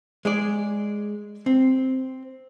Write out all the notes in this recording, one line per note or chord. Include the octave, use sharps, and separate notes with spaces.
G#3 G#4 D5
C4